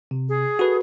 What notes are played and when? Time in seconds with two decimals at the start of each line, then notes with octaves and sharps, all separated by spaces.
0.11 C3
0.29 G#4
0.59 F#4 A4 B4